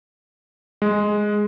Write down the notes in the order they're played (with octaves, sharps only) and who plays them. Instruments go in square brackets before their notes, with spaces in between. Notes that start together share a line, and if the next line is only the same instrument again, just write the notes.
[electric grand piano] G#3